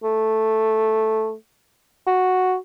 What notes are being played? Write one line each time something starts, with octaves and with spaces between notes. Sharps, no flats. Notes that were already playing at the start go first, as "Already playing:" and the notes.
A3
F#4